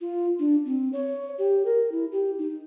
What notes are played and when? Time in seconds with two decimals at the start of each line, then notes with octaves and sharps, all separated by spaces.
0.01 F4
0.39 D4
0.65 C4
0.93 C#5
1.38 G4
1.65 A#4
1.92 E4
2.12 G4
2.38 D#4